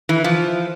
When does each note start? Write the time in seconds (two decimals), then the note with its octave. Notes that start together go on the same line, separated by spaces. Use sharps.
0.09 E3
0.24 F3